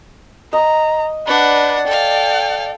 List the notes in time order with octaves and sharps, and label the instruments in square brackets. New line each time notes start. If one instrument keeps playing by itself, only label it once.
[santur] D#5 [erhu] A#5
[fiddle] D4 F#5 [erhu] B4 [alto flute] D5
[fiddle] A4 F5 [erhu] G5